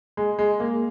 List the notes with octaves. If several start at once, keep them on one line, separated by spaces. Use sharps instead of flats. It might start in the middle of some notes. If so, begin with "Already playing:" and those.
G#3
G#3
A#3